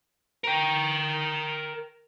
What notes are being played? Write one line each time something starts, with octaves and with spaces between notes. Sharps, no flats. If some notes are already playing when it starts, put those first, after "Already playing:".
A#4 G5